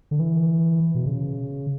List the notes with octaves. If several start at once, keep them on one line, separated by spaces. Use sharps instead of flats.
D3
E3
B2
C#3